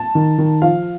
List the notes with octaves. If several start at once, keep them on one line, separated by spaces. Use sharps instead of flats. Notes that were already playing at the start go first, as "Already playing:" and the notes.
Already playing: A5
D#3
D#3
F3 F5